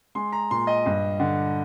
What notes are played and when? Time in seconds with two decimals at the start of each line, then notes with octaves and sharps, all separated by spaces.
0.15 G#3 C6
0.32 A#5
0.51 A#2 C6
0.67 D#5
0.86 G2
1.20 D3